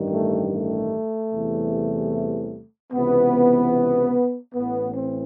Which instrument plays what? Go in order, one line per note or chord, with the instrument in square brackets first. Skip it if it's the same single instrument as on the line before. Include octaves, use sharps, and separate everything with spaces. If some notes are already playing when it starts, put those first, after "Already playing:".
Already playing: [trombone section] A1 G2 D#3 G3
A3
A3
E2 C3 E3 G3
C#2 C3 E3 B3
A1 A2 E3 B3
C4